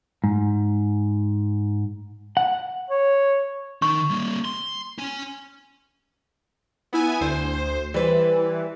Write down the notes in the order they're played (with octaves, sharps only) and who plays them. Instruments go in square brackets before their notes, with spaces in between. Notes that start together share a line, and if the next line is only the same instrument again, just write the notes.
[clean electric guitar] G#2
F#5
[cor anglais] C#5
[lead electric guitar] D#3 D#4 [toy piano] C#6
[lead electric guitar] G3 A#3
C6
C#4 G#5
[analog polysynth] B3 E4 G#5
D2 C5
[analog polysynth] E3 [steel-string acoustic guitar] G3 B4 C5